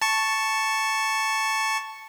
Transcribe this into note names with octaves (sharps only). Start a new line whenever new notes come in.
A5 C#6